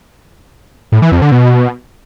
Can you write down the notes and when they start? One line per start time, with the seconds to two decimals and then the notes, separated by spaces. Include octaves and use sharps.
0.92 A2
1.02 E3
1.12 F2
1.22 D3
1.32 B2